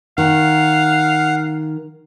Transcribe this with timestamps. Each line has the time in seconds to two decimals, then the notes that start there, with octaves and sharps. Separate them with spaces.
0.18 D#3 F5 F#5